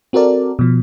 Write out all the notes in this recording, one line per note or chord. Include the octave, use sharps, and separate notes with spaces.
C4 F#4 A4 A#4 D5
B2 F3